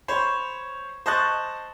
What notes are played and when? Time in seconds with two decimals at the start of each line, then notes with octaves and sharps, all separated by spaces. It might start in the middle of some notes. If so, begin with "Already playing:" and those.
0.08 C5 C#5 B5
1.06 C5 D#5 A5 C#6 F#6 A6